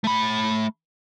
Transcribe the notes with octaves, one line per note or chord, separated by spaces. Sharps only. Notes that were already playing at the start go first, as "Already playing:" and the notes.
A3 B5